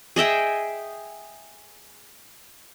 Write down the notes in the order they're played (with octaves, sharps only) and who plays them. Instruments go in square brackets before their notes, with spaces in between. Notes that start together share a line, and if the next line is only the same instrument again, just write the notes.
[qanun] G#4 D#5 E5 G5